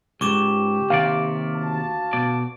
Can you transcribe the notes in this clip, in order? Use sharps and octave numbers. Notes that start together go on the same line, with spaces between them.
C#2 G#2 G4 C#6 D6 E7
D#2 C3 D5 F5
D2 F#4 A5
B2 D5